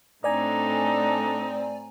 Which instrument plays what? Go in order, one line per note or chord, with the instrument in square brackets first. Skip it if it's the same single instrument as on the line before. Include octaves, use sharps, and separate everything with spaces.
[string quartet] A2 C4 [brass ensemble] D4 A4 [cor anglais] D#4 [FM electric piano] D5 G#5 A#5